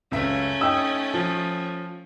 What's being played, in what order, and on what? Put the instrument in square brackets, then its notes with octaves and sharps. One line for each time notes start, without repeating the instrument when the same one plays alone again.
[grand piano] C#2 F#2 E5 [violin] A3 C#4
[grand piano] D#4 [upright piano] G5 D#6 E6
[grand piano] F3